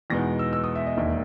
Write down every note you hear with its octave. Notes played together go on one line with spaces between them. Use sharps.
E2 B2 G#3 B3 D#4 A#6
E6
E6
D#6
E5
D#5
E1 D#2 D#3 E5